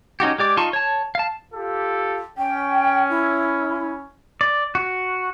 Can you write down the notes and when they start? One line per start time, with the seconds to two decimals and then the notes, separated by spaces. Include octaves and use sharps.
0.20 C#4 D#4 F#4 G4
0.38 G#3 G4 D5 D6
0.57 D#4 F4 A5 C6 C#6
0.73 C#5 A5
1.15 F5 A5
1.53 F4 G4 A4
2.38 C#4 G5
3.10 E4
4.41 D5
4.75 F#4